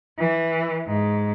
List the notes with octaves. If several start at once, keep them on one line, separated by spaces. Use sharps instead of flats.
E3
G#2